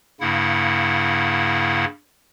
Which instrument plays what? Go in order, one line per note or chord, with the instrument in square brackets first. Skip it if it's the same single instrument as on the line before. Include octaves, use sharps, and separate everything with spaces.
[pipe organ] G2 C#3 A#3 E4 F#5